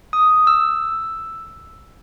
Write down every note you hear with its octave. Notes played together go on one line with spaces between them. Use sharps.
D#6
E6